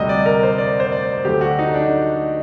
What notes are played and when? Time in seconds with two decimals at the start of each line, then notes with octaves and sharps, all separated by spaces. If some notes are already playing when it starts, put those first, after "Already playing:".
Already playing: D2 C3 G3 D#5
0.09 D5
0.26 A#4
0.43 C5
0.58 D5
0.80 C5
0.92 D5
1.25 D2 D3 F#3 A3 G4
1.41 F#4
1.59 D#4
1.74 D4